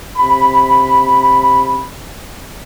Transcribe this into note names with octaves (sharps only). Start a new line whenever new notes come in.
C3 B5